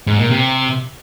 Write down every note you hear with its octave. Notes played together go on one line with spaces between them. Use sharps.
G#2
A#2
C3